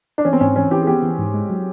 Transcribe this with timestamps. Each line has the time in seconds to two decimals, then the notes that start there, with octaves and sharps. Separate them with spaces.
0.18 D4
0.25 E3 C#4
0.33 C4
0.41 G#2 C#4
0.56 E3 C#4
0.71 E3 G4
0.82 G#4
0.87 B3 G4
1.03 E3
1.19 G#2
1.34 G#3
1.50 F#3